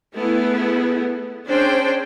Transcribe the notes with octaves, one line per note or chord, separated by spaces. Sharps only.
A3 B3 E4 G#4
C#4 D4 G#4 C5 G5